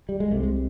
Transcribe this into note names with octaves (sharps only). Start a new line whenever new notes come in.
G3
G#3
C2 C3 A3
G#3